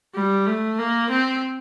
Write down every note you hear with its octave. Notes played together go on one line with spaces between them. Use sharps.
G3
A3
A#3
C4